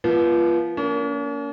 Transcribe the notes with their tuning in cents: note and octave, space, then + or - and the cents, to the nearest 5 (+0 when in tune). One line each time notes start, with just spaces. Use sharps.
F3 -25 B3 -30
A#3 +0 C#4 +45